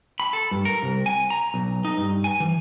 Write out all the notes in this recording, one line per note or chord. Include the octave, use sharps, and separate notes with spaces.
B5
A4
G2
A#4
C2
G#5
A#5
B1
D#4
G2
G#5
E3